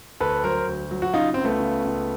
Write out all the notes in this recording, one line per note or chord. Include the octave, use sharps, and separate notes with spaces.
D2 A4 B4
F#3 A#4 C5
D2
F#3
F#4
C#3 D#4 F4
C#2 C4
A3 B3
C#3
C#2